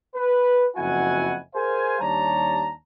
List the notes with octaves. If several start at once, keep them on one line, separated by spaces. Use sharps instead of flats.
B4
F#1 F2 E4 F#4 F#5 G#5
G#4 A#4 C5 F5 G#5
D#2 G3 D4 C#5 A5 A#5